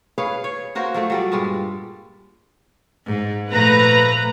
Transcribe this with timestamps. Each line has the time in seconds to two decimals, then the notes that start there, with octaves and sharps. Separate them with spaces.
0.18 G#4 B4 C#5 F5
0.44 C#5
0.75 A#3 F#4 A#4 C5
0.94 F3 F#3 A3
1.10 F#3 G3 D5
1.32 G2 A#2 G3 G#3
3.06 G#2
3.50 A#2 F3 A3 B4 A#5